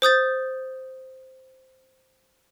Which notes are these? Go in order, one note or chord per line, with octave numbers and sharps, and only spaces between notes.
C5 D#6 G6 A6